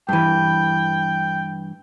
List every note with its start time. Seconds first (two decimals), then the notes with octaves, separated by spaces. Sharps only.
0.09 G2 E3 G5